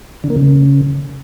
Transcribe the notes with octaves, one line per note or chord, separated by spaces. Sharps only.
D3
A#3
C#3